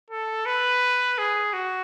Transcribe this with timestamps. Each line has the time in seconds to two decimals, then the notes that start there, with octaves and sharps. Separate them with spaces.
0.10 A4
0.46 B4
1.18 G#4
1.53 F#4